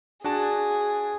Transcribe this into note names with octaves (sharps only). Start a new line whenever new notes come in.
D4 F#4 G#4 A5